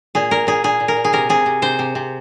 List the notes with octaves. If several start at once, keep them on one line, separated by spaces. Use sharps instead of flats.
A#2 G#4
A#2 A#4
A#2 G#4
A#2 G#4
A#2
A#4
A#2
G#4
C3 A#4
C3 G#4
C3
C3 C5
C3
C3